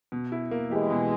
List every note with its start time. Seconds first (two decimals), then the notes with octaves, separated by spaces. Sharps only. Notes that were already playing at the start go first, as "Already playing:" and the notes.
0.12 B2
0.32 E4
0.51 A#3
0.71 E3 G#3 G4
0.90 B2